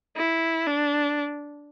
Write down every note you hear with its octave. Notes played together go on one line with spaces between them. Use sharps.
E4
D4